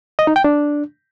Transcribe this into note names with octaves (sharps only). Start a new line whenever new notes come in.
D#5
D#4
G5
D4